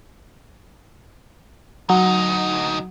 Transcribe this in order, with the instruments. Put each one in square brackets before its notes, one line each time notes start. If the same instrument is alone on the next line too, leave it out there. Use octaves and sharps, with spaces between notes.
[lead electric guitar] D2 D#4 [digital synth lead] F#3